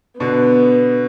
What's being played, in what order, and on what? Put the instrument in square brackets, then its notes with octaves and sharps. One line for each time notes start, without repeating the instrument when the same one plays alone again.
[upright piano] B2 D3 [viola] B3